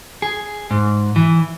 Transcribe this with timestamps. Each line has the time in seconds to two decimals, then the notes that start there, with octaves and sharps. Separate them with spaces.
0.22 G#4
0.71 G#2
1.16 E3